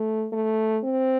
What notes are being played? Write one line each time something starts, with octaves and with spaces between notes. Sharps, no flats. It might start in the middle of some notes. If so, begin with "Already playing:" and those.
Already playing: A3
A3
C4